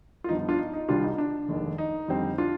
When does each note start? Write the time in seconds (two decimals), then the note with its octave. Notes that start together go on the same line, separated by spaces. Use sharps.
0.24 F4
0.29 G2 F3 B3 D#4
0.39 D#4
0.49 D4 F4
0.59 D#4
0.73 D#4
0.88 C2 C3 G3 D4 F4
1.04 D#4
1.18 D4
1.48 F1 D#2 D#3 G#3
1.78 D#4
2.08 F2 D3 G3 C4
2.38 D4 F4